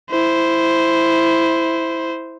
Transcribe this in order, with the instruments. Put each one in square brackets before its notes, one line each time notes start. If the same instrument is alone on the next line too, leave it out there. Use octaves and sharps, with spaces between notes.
[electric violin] E4 C5